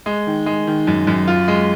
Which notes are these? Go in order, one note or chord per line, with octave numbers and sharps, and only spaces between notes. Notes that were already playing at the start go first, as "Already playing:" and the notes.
G#3
D#3
G#3
D#3
F#2
F#2
F4
G#3